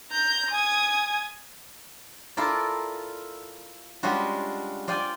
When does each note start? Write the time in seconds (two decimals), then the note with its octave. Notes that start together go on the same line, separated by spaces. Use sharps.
0.11 A#5 G6
0.51 G#5 D#6 G#6
2.37 E4 F4 A4 A#4 D5
4.03 G3 G#3 C#4 D4 F4 F#4
4.88 F4 D5 G5 G#5